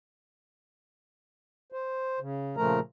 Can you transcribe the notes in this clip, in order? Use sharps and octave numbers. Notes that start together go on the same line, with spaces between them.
C5
C#3
A#2 C#3 F3 A3 A#4 A#5